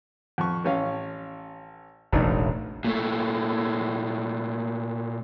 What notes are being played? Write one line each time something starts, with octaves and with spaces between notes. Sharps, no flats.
F2 C#6
A1 C#4 F5
E1 A1 D4 D#4
A#2 A3